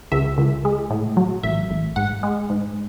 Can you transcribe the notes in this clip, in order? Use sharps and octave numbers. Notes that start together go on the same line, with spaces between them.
C#2 E5
C#2
G#3
A2
F#3
A1 E5
A1
G#2 F#5
G#3
G#2